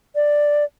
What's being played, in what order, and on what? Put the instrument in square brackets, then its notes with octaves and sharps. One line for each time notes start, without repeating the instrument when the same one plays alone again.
[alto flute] D5